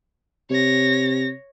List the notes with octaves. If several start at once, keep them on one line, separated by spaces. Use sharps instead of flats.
C3 C#5 A#6